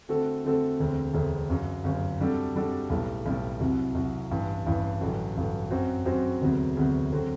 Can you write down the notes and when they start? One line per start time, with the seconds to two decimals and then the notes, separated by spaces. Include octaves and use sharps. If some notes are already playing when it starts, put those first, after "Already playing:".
0.08 D3 A3 C4 F#4 A4
0.45 D3 A3 C4 F#4 A4
0.80 E1 D2 D3 A3 C4
1.14 E1 D2 D3 A3 C4
1.49 G1 F#2 F#3
1.84 G1 F#2 F#3
2.19 C3 G3 D4 F#4 A4
2.55 C3 G3 D4 F#4 A4
2.90 B1 A2 G3 B3
3.26 B1 A2 G3 B3
3.60 C2 C3 F#3
3.95 C2 C3 F#3
4.30 A1 G2 E3
4.66 A1 G2 E3
5.01 A1 G2 D3 F#3
5.35 A1 G2 D3 F#3
5.70 F#2 F#3 C4 F#4 C5
6.05 F#2 F#3 C4 F#4 C5
6.41 E1 D2 C3 F#3 B3
6.77 E1 D2 C3 F#3 B3
7.12 D3 F#3 C4 F#4